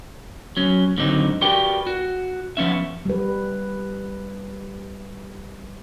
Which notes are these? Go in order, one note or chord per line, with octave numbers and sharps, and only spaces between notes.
F#3 C#4
G#2 D3 D#3 F#3 C4 D#4
F#4 G4 A#4 B4 D5 G5
F#4
F3 B3 C#4 E5
G3 B4